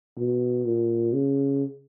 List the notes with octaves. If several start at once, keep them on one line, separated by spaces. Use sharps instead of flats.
B2
A#2
C#3